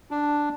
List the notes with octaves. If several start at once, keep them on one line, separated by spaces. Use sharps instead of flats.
D4